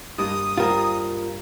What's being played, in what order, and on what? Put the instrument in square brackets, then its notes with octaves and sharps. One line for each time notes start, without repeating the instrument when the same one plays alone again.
[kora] G2 A#3 D#5 [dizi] D#6
[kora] G3 A#3 C5 [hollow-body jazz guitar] F4 A#4